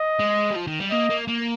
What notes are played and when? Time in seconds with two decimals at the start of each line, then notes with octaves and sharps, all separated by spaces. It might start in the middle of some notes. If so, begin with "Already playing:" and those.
Already playing: D#5
0.19 G#3
0.51 G3
0.55 F3
0.67 D#3
0.79 G3
0.91 A#3 D#5
1.10 A#3
1.28 A#3